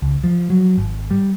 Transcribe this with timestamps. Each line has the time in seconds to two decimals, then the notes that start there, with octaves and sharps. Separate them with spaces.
0.02 C#2
0.24 F3
0.50 F#3
0.78 G#1
1.11 G3